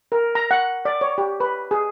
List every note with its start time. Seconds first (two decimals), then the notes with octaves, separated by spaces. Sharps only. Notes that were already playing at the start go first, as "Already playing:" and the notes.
0.12 A#4
0.35 A#5
0.51 F#5
0.85 D5
1.01 C#5
1.18 G4
1.40 B4
1.71 G#4